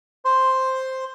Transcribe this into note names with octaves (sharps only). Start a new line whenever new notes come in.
C5 C6